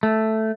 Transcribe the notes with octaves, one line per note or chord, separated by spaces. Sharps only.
A3